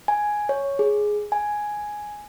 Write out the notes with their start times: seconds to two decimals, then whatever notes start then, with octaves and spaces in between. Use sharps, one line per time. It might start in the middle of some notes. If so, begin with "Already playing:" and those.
0.08 G#5
0.49 C#5
0.79 G#4
1.32 G#5